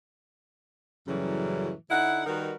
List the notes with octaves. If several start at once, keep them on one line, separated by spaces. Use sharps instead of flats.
F#2 A2 C#3 E3 F#3 G3
D3 D#4 E4 F#5
D#3 G3 D#4 F#4 A#4 B4